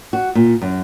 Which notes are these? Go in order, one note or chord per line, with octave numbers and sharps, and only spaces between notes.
F#4
A#2
F#2